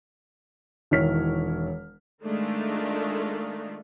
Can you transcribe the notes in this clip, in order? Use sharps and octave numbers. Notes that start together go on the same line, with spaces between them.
E1 D#3 E4 C#5 F6 B6
D#3 G#3 A3 D4 D#4 F4